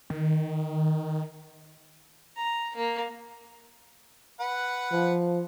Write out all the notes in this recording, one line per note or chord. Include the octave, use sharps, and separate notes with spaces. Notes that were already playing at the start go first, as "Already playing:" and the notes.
D#3
A#5
A#3
B4 F#5
F3